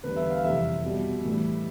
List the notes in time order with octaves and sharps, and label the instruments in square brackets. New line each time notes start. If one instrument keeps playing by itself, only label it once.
[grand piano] E2 D3 G3 B4
E5
F5
F2 C3 E3 G3 E5
B2 G3
A2 E3 G3